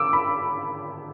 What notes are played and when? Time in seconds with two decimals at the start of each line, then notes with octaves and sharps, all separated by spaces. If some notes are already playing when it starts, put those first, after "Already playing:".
Already playing: D6 E6
0.13 B5